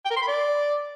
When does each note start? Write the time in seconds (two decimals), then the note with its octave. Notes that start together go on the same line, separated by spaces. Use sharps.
0.05 G5
0.11 A#4
0.16 C6
0.22 B5
0.27 D5